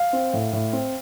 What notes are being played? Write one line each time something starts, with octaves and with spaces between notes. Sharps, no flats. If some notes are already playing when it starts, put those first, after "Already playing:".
Already playing: F5
C4
A2
A2
C4